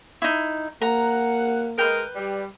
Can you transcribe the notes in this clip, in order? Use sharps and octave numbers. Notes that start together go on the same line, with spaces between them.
D#4 E4
A#3 F#5 A#5
G#3 A#4 B4 G5
G3